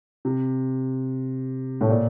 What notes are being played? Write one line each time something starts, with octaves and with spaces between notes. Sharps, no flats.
C3
A2
A#2